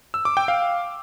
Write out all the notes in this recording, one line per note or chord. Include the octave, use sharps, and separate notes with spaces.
E6
D6
G5
F5